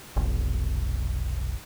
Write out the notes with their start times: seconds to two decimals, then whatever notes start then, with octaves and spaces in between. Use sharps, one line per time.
0.16 F1 B1